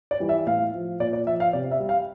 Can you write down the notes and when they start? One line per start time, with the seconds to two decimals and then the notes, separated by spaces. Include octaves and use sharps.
0.11 D5
0.20 E3 G3
0.29 E5
0.47 A2 F5
0.73 F3
1.00 A#2 D5
1.13 D5
1.26 F3 E5
1.40 F5
1.53 C3 D5
1.71 E5
1.80 G3
1.89 F5